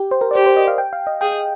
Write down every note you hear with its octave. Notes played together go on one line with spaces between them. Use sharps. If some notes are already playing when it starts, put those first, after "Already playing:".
Already playing: G4
C5
A#4
D5
G4 C5
C5
D#5
F5
G5
F5
D#5
G#4 G5